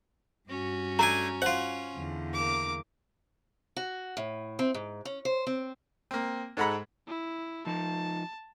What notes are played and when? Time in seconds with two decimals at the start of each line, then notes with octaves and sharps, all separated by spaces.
0.49 G2 C#4 F#4
0.99 A3 D4 G#5 A#5
1.42 F4 C5 F#5
1.94 E2 D3
2.33 A#3 D6
3.76 F#4
4.17 A2
4.59 C4
4.74 G#2
5.05 C#4
5.25 C5
5.47 C4
6.11 A#3 C4
6.57 G#2 G#3 A4 F#5 A#5 B5
7.07 E4
7.66 F3 D#4 A5